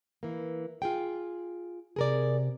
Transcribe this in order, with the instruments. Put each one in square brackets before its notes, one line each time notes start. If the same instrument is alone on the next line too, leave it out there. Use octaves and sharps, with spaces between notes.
[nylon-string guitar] E3 A#3
F4 G#4 G5
[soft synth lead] C3 [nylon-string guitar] G#4 A#4 D5